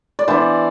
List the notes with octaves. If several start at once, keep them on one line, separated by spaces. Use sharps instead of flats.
D5
E3 B3 D4 C5